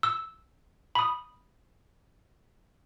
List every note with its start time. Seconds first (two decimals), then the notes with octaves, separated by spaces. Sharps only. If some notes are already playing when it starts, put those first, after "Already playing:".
0.03 E6
0.95 B5 D#6